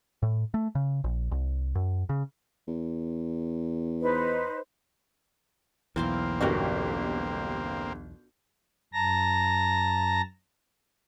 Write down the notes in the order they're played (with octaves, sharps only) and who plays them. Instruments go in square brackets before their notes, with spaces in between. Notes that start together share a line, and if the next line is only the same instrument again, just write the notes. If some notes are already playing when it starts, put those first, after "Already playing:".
[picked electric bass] A2
A3
C#3
A#1
C2
F#2
C#3
[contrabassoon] E2
[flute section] D#4 B4 C5
[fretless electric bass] B1 E2 [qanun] E3 C5 F5 [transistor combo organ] A#3 C4
[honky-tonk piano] G1 G4 [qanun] C#4 F#4 A#4
[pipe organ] F#2 A5 A#5 A#6